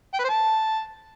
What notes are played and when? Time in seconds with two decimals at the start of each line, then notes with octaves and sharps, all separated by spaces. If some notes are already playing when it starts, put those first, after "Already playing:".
0.14 G5
0.19 B4
0.24 C5
0.29 A5